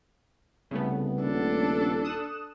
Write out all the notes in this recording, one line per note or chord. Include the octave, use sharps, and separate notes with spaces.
C2 C#3 A3 B3
D#1 D4 A4
D#6 F#6 E7